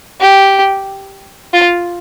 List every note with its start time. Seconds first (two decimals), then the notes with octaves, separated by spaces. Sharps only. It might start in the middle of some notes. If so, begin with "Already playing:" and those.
0.20 G4
1.53 F4